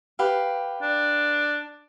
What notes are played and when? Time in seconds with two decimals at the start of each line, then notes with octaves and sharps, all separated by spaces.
0.19 G4 B4 F5
0.82 D4